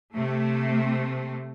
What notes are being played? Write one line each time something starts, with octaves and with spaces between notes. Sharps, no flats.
C3 A3